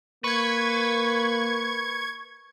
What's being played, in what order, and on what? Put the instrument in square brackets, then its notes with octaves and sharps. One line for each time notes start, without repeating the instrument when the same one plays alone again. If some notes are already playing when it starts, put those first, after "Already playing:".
[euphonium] A#3 [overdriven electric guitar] B4 [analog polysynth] C#6 G#6